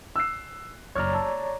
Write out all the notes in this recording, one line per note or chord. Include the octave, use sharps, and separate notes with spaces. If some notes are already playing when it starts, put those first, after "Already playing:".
E6 F#6 C7
F#1 C#5 D5 A#5 F6
A5 E6